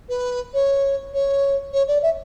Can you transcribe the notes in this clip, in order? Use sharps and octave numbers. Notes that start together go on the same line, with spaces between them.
B4
C#5
C#5
C#5
D5
E5